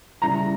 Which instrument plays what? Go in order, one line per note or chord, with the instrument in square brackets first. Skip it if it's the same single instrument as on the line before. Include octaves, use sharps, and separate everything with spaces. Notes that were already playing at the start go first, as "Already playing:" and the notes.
[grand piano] C#3 G3 C#4 E4 [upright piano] A#5